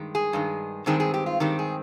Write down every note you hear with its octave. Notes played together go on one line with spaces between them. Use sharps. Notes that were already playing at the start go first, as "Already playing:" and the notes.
Already playing: G2 D#3 G#3
G#4
G2 D#3 G#3
G2 D#3 G#3 C4 G#4
G#4
G4
F4
G2 D#3 G#3 C4 G4
G#4